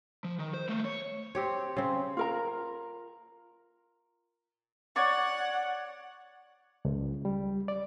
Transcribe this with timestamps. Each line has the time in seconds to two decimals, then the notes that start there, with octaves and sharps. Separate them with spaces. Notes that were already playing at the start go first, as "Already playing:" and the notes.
0.24 F3
0.39 D#3
0.54 C5
0.69 A3 A#3
0.85 C#5
1.35 C4 G4 C#5
1.77 C#3 C4
2.17 F4 A#4 A#5
4.96 C#5 D5 F#5 C#6
6.85 C#2
7.25 G3
7.68 D5